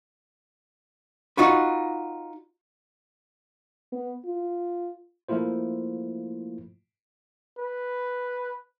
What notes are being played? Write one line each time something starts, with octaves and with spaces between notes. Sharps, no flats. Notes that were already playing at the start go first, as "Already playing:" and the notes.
D#4 F4 F#4 B4
B3
F4
F3 A3 A#3 E4 F4 C5
B4